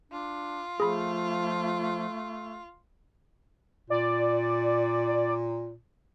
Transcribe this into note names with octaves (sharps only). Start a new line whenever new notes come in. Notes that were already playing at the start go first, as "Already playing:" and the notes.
D4 F4
F3 A3 G#4 B5
A#2 D5